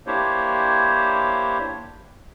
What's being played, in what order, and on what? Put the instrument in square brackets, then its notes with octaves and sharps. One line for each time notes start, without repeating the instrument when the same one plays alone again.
[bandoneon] A#3 D4 E4 G4 C5 C#5